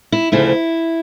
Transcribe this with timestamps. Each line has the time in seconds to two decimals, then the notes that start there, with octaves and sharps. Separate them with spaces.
0.12 E4
0.32 D2 C#3 F3 A3 E4